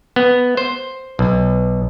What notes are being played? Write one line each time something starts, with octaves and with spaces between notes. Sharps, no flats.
B3
C5
B1